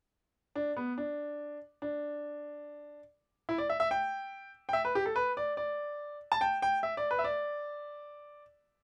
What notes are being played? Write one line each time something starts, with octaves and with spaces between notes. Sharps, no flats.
D4
B3
D4
D4
E4
D5
E5
E5
G5
G5
E5
B4
G4
A4
B4
D5
D5
A5
G5
G5
E5
D5
B4
E5
D5